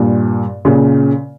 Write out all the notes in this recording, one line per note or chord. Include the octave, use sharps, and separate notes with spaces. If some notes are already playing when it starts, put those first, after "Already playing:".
Already playing: G2 A#2
A#2 C#3